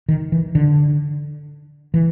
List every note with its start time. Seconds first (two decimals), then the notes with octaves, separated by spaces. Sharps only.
0.09 D#3
0.32 E3
0.55 D3
1.94 E3